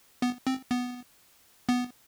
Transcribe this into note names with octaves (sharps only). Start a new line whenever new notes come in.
B3
C4
B3
B3